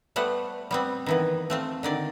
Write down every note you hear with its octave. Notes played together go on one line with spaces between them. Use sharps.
G3 A3 B3 C5 F#5
G3 B3 C4
D#3 E3 B3
A3 C4 F4
D3 D#3 D5